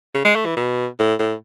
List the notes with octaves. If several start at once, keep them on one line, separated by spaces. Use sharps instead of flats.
C#3
G#3
A3
E3
B2
A2
A2